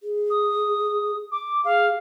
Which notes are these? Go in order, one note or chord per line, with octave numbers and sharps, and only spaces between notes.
G#4
D#6
D6
G#4 F5